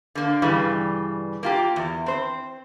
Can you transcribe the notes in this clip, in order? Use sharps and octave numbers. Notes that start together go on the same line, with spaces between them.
D3 A#3
G2 C#3 E3 G3
A#3 F4 G4
E2
C4 C5